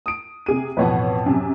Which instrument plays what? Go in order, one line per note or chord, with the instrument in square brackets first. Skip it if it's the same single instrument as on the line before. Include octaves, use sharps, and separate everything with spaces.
[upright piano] D#6 D7
[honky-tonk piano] C3 G#4 D#7
[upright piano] A1 F2 B2 [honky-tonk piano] B4 C#5 F#5
[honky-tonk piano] F#2 C3